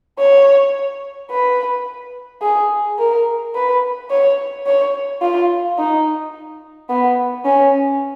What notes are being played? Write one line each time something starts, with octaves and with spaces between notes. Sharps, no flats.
C#5
B4
G#4
A#4
B4
C#5
C#5
F4
D#4
B3
C#4